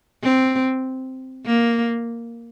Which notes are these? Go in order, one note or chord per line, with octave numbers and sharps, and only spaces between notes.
C4
A#3